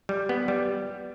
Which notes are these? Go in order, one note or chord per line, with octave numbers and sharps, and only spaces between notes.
G3
B3
G3